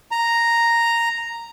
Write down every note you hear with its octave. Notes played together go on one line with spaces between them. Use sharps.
A#5